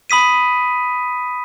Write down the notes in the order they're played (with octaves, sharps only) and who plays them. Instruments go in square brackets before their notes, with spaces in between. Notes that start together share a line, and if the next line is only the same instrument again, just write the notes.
[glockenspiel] B5 D#6 B6 D#7